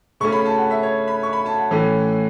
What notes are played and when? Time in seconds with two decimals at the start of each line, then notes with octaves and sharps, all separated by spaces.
0.20 C#3 A3 C#4 C#6
0.32 B5
0.45 A5
0.58 F#5
0.71 E5
0.83 C#5
1.08 B5
1.23 C#6
1.33 B5
1.46 A5
1.58 F#5
1.71 A2 E3 A3 C#4